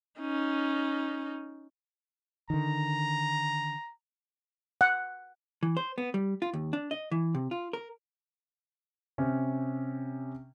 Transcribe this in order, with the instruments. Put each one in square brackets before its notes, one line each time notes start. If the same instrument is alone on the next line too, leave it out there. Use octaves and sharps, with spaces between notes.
[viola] C#4 D#4
[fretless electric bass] D3 D#3 [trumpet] A#5
[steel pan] F#5
[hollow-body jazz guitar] E3
C5
B3
G3
F4
D#2
D4
D#5
E3
C3
F4
A#4
[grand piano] C3 C#4